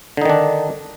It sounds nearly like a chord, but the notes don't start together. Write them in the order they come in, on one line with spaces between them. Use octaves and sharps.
D3 D#4 D#3 D4